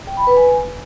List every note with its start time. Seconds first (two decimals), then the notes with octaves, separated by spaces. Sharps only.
0.07 G5
0.17 B5
0.27 B4
0.37 G#5